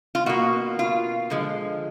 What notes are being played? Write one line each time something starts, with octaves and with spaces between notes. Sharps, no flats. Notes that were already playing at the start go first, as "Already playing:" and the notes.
F4
B2 A#3 F#4
F4
D3 F3 G#3